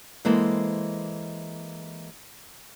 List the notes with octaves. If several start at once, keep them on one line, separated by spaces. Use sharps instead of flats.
E3 G#3 A#3 A4 C5